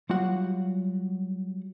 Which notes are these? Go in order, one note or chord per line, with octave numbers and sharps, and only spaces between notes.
F#3 G3 F4 F#4 F#5